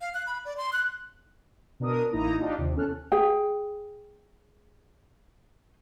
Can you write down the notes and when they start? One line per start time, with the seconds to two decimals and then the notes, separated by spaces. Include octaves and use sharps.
0.01 F5
0.14 F#6
0.27 B5
0.45 D5
0.57 C6
0.73 F#6
1.80 B2 D4 A#4 D#6
2.12 A1 A#3 D#4 E4 A#5 D#6
2.39 D4 D#4 F4 G4 D5
2.58 D#2 C3
2.75 E2 C#4 A4 F6 F#6
3.12 G#4 G5